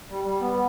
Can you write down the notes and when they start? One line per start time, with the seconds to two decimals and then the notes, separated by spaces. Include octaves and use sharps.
0.10 G3
0.24 G3
0.40 B3